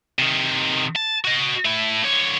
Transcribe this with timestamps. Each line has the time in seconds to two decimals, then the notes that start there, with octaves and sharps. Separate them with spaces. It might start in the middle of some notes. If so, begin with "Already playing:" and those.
0.19 C3 D#3
0.96 A5
1.25 F#4 D#5
1.65 A3 E4
2.03 D3 C#5